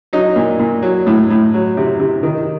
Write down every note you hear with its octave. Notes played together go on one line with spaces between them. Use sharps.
F#3 D#4
A#2
A#2
F#3
A2
A2
F#3
C3
C3
D#3